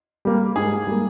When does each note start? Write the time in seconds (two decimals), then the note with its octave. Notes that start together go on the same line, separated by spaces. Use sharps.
0.25 G3 A#3
0.55 G#2 G#4
0.87 G3 A#3